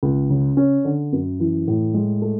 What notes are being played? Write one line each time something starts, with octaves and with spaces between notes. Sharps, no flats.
C#2
C#3
C#4
D3
F#2
E3
A2
G#3
A3